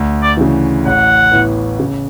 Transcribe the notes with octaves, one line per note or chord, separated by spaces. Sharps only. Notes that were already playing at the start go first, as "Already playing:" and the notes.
Already playing: D2
D5
C#3 E3
A1 F#5
A2 E3 B3
C#3